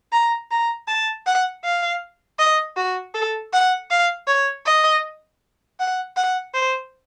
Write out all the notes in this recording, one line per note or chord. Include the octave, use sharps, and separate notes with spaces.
A#5
A#5
A5
F#5
F5
D#5
F#4
A4
F#5
F5
C#5
D#5
F#5
F#5
C5